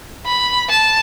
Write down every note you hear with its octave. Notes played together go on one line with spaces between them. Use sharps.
B5
A5